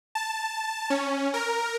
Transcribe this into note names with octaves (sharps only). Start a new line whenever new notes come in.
A5
C#4
A#4